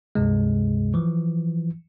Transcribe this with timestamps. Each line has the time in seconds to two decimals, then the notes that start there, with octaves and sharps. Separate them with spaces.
0.15 C#2 G2 C3 G#3
0.94 E3 F3